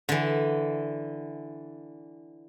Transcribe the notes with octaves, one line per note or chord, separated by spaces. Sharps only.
D3 E3